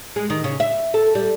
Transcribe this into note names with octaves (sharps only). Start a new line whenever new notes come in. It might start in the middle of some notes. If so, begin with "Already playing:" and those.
G#3
D#3
C#3
E5
A4
G3